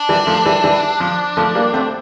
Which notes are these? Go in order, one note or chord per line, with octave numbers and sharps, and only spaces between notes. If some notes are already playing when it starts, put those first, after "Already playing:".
Already playing: D4
E3 G3
F3 A3
E3 G3
E3 G3
F3
F3 A3
G3 A#3
A3 C4